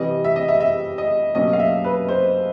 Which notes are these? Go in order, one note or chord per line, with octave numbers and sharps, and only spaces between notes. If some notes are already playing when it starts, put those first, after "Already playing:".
Already playing: C3 E3 G3 D#5
E5
D#5
E5
E5
D#5
B2 F#3 A#3 C#4 D#5
F5
E5
B4
C5